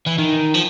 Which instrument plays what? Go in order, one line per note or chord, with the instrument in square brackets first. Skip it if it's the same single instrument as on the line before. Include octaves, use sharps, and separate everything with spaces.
[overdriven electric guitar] E3
D#3
F3